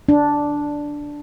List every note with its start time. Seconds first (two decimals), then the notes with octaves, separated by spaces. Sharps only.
0.09 D4